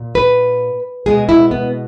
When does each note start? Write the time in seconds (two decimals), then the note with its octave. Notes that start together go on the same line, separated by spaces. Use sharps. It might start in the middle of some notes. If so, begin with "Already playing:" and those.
Already playing: A#2
0.15 B4
1.06 B2 G#3 B3 G#4
1.29 E4
1.51 B3